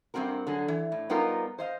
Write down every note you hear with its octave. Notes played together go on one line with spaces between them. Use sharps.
G2 A#2 C4 F#4 A#4
D3 F#3 G#4
E3
A2
G3 B3 D#4 F4 A#4 D#5
C5 D#5 F5